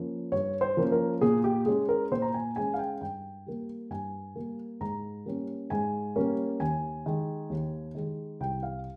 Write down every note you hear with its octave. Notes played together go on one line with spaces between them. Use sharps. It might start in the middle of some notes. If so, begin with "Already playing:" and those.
Already playing: F3 A#3 C#4
G2 C#5
C5
F3 A#3 C#4
A#4
A#2 G#4
G4
G#3 C#4 G#4
A#4
A#2 C5
A#5
G#5
G#3 C#4 G#5
F5
G5
G2 G5
G3 A#3
G2 G#5
G3 A#3
G#2 A#5
G3 A#3 C#4
G#2 G#5
G3 A#3 C#4
D#2 G#5
D#3 G#3
D#2
D#3 G#3
C2 G5
F5